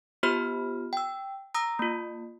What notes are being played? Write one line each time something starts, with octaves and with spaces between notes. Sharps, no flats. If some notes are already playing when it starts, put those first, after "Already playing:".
B3 F4 G4 C5 B5 F6
G5 E6
A#5 D#6 E6 A#6
A#3 F4